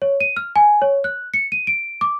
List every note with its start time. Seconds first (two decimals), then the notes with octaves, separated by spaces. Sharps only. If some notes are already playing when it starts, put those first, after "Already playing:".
0.02 C#5
0.20 D#7
0.37 F6
0.56 G#5
0.82 C#5
1.04 F#6
1.34 C#7
1.52 D#7
1.67 D7
2.01 D6